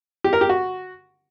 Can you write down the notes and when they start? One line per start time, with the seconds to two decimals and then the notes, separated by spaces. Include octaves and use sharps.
0.24 G4
0.33 A#4
0.41 G4
0.49 F#4